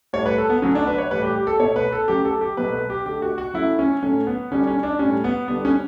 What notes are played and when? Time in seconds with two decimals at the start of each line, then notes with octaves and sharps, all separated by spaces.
0.13 A2 G3 C#5
0.26 B4
0.38 A4
0.50 B3
0.62 D3 F#3 A3 C#4
0.75 D4
0.87 B4
0.98 C#5
1.11 A2 E3 G3 B4
1.23 G4
1.36 G4
1.47 A4
1.60 B2 A3 C#5
1.76 B4
1.92 A4
2.08 C#3 F#3 A3 G4
2.25 A4
2.41 G4
2.57 B2 F#3 A3 B4
2.72 B4
2.90 G4
3.05 D3 A3 G4
3.22 F#4
3.38 F#4
3.53 C#3 F#3 A3 E4
3.79 C#4
4.02 A2 F#3 A3 C#4
4.27 B3
4.51 D3 G3 C#4
4.67 C#4
4.83 D4
4.99 A2 G3 C#4
5.24 B3
5.48 D3 G3 B3
5.65 C#4